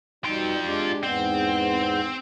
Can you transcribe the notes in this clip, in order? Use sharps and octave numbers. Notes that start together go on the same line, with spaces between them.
B2 G3 D#4 F4 G5
G#3 D4 G4
E2 G#2 B3 C4